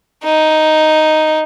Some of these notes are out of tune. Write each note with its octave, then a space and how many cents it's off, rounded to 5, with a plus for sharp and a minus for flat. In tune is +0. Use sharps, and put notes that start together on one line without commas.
D#4 +0